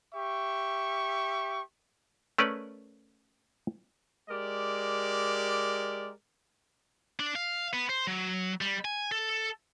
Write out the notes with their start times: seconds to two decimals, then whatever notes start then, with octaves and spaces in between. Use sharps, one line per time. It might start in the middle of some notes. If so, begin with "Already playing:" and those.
0.14 G4 E5 C#6
2.38 A3 C#4 A#4 B4 D5
4.29 G#3 G4 A#4 D5
7.20 D4
7.36 F5
7.73 B3
7.89 C5
8.07 F#3
8.61 G3
8.85 G#5
9.12 A4